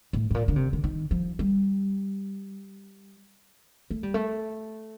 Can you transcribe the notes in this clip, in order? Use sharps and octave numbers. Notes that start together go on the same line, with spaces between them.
A2
A2
A#2
D3
C3
D3
D#3
F3
G3
A3
G3
A3